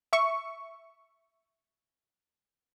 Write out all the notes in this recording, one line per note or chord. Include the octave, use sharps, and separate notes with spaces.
E5 C#6